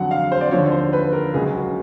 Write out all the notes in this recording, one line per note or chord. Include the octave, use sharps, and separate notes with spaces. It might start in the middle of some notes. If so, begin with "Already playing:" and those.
Already playing: F2 D3 F#3 F#5
F5
C5
D5
D#2 D3 F3 C#5
C5
B4
A#4
C#2 C#3 F#3 A#3 G#4
F#4